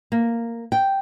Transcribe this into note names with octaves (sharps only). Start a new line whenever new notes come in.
A#3
G5